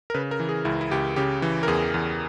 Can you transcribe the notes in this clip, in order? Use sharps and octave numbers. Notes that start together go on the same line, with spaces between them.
A#4
C#3 B4
A#4
E3
G#4
C#2 E4
E4
C#2 G4
C#3 G4
E3
A#4
E2 G#4
E2